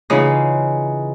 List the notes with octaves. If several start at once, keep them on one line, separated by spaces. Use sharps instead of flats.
C#3 E3 C#4 D#4 F4 G#4